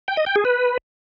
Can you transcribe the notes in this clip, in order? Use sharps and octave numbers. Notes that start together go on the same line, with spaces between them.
G5
D#5
G5
G#4
B4